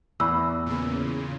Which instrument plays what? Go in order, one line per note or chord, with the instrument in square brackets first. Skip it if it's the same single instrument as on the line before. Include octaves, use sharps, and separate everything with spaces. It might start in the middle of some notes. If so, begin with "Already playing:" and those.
[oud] E2 [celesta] B5 E6
[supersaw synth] A#2 C#3